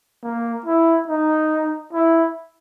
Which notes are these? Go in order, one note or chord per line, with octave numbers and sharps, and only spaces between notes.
A#3
E4
D#4
E4